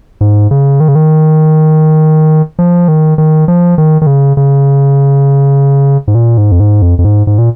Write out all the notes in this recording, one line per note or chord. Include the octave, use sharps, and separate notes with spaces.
G#2
C#3
D#3
C#3
D#3
F3
D#3
D#3
F3
D#3
D#3
C#3
C#3
G#2
A#2
G#2
F2
G#2
F2
F2
G#2
G#2
A#2